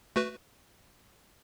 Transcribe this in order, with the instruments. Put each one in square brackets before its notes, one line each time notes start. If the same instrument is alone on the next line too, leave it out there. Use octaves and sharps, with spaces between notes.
[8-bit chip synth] A3 F#4 B4